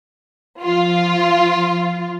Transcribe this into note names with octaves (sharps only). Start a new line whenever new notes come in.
F3 F4